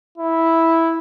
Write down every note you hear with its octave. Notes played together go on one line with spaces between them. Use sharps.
E4